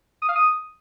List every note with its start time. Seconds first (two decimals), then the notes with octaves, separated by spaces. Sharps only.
0.22 D#6
0.29 F5
0.36 D#6